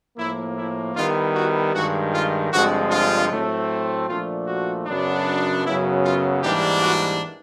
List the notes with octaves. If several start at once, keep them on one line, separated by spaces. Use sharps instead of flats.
A2 F3 A#3 E4
E4
D#3 G3 B3 E4 F4
F#4
G2 D#3 G#3 F#4
F4
G2 D3 F3 G#3 C4 F#4
F4
A2 F#3 A3 C4
A#2 F3 A3 D4 F4
F#4
F#2 C#3 F#3 B3 D4
F#2 C#3 F#3 B3 E4
F4
G#2 E3 G3 A#3 D4 G4
F#4